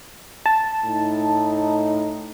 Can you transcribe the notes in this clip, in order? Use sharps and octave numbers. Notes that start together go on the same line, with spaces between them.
A5
A2 D#4